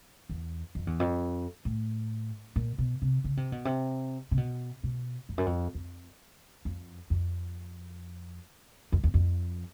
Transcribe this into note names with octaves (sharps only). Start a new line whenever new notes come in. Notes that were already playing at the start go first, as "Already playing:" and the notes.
E2
F2
E2
F2
A2
A#2
B2
C3
C#3
C3
B2
C3
C3
B2
B2
F2
F#2
F2
F2
F2
F2
F2
E2
F2